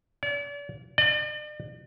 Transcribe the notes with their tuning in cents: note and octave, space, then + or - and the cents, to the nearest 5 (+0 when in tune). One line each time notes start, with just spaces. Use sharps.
D5 -40
D5 +45